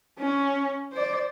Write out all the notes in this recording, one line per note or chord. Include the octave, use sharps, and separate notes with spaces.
C#4
C5 D5